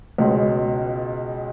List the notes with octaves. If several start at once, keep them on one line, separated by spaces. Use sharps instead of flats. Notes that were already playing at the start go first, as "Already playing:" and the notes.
C#2 B2 G#3 C#4